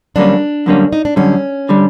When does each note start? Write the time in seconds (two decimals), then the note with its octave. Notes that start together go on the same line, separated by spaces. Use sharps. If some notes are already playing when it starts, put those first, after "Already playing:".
0.16 F#2 D3 G3 A#3 C#4 D4
0.66 F#2 D3 G3 A#3 C#4
0.93 D#4
1.05 D4
1.16 F#2 D3 G3 C#4
1.69 D3 G3